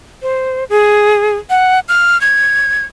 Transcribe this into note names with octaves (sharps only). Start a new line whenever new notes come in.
C5
G#4
F#5
F6
G#6